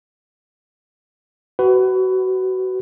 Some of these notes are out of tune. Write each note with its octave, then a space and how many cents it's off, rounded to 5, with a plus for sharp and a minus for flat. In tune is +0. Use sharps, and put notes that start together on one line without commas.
F#4 +25 B4 +20